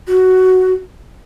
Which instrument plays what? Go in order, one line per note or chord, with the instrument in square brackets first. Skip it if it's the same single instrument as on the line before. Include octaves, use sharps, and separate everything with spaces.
[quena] F#4